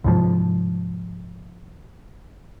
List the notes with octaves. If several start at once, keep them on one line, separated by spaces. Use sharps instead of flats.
C2 G#2 F3